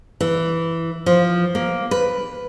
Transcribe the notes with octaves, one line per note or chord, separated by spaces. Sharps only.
E3
F3
A#3
B4